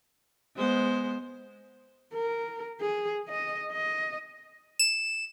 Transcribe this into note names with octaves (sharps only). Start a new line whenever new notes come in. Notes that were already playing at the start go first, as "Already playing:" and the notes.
G#3 B3 C5
A#4
G#4
D#5
D#5
E7